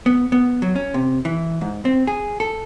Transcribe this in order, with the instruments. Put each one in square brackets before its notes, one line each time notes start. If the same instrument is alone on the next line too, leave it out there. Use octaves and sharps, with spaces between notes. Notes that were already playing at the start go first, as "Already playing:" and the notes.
[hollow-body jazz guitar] B3
B3
F#3
C#4
C3
E3
G#2
C4
G#4
A4